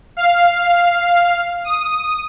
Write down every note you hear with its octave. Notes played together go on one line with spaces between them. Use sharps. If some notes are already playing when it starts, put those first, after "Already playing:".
F5
D#6